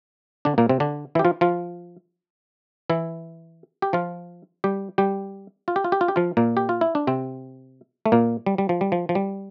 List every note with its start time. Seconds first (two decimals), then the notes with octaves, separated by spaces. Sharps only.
0.45 D3 D4
0.58 A#2 A#3
0.69 C3 C4
0.80 D3 D4
1.15 E3 E4
1.19 G4
1.25 F3 F4
1.41 F3 F4
2.90 E3 E4
3.82 G4
3.93 F3 F4
4.64 G3 G4
4.98 G3 G4
5.68 F4
5.76 G4
5.84 F4
5.92 G4
6.01 F4
6.08 G4
6.16 F3 F4
6.37 A#2 A#3
6.57 G4
6.69 F4
6.81 E4
6.95 D4
7.07 C3 C4
8.06 A3
8.12 A#2 A#3
8.46 G3
8.58 G3
8.69 F3
8.81 G3
8.92 F3
9.09 F3
9.15 G3